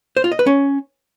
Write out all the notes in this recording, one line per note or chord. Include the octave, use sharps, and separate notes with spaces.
C5
F4
D#5
B4
C#4